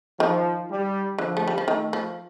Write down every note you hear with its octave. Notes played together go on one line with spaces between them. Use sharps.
D#3 F3
G3
D3 F3
A3
G3
F3
D#3 A3
F3